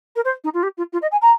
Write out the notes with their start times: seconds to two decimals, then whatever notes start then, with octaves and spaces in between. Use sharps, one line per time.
0.15 A#4
0.24 C5
0.44 D#4
0.54 F4
0.63 G4
0.77 F4
0.92 F4
1.02 D#5
1.11 G#5
1.21 A#5